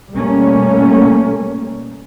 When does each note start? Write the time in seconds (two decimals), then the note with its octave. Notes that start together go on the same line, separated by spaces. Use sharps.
0.12 B2 G3 A3 A#3 C#4